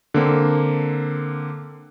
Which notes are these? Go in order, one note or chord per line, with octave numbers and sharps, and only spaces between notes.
D3 A#3 C4